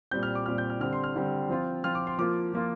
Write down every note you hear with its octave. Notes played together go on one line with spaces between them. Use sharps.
A#2 G3 C4 G6
F6
D6
A#2 G3 C4 F6
G6
F6
D3 G3 C4 F6
C6
F6
D3 G3 C4
F3 C4 F4
F3 C4 F4 F6
D6
C6
F3 A#3 F4 D6
F3 A#3 F4